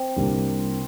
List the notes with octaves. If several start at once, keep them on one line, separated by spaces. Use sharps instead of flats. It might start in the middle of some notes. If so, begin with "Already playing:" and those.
Already playing: C4
C2 C3 G3 A#3 D4